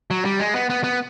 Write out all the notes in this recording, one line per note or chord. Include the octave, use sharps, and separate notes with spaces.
F#3
G3
G#3
B3
B3
B3